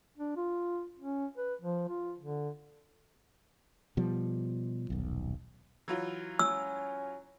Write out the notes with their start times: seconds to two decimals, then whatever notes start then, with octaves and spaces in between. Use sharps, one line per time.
0.18 D4
0.36 F4
0.99 C#4
1.38 B4
1.61 F3
1.89 F4
2.19 D3
3.97 B2 F3 G3
4.90 D#1 B1
5.88 E3 F#3 F4
6.39 C#4 E6